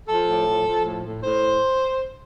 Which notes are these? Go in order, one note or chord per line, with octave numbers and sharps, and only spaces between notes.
F3 A4
A2
F3
F3
A2
A2
A2 C5